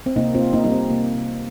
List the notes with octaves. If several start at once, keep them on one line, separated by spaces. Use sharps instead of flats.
C4
C3 A#3 D#4
C4 F4
A#3
A#3 D#4
G3 D#4
C4
C3 A#3
C3